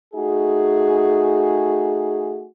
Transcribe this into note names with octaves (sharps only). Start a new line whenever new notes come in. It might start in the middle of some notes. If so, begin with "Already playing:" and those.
A3 D#4 F#4 G#4